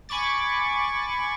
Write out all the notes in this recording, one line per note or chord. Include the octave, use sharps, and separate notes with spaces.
G#5 B5 C#6 D6 A6